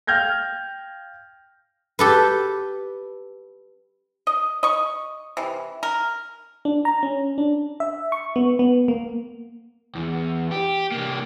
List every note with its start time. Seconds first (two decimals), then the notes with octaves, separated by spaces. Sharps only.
0.07 F5 G5 F6 G6 G#6 A#6
1.99 G4 A4 B4
4.27 D#5
4.63 D#5 C#6
5.37 C3 E3
5.83 A#4
6.65 D4
6.85 A#5
7.03 C#4
7.38 D4
7.80 E5
8.12 C#6
8.36 B3
8.59 B3
8.88 A#3
9.95 E2
10.51 G4
10.92 C2 A#3